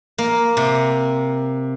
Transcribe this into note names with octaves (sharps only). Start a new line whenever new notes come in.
A#3
C3